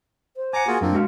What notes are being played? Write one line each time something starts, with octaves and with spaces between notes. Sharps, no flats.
C5
F#5 G#5 A#5 D6
A#3 F4 F#4 G#4
F#2 A#3 C4 D4 F4
G#3 F#4 F5